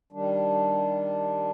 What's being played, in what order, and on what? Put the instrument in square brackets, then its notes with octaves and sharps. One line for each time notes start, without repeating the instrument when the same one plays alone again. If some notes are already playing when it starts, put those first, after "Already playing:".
[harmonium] D#3 G3 D4